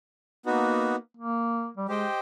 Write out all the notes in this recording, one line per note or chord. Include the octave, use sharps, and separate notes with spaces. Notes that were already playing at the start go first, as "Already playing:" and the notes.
A#3 B3 D#4 F#4
A#3
G3
G#3 G4 C5 D#5 G5